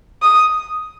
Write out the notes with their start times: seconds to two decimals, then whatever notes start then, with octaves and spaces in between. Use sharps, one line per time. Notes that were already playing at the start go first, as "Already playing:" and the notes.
0.23 D#6